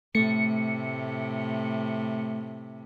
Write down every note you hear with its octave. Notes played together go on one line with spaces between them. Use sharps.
A2 C3 A3 C#7